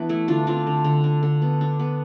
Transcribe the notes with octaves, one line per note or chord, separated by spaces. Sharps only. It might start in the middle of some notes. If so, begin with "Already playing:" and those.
Already playing: E3 B3 D4
A3 E4
D3 D4 F4
C4 D4 F4
D3
D3
D4
D3
B3
D4
B3